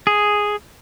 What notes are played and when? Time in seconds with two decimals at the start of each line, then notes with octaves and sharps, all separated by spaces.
0.07 G#4